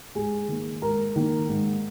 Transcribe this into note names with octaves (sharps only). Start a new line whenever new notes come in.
G#2 G#4 G#5
D#3 A#3
G#2 A#4 A#5
D#3 A#3
G#2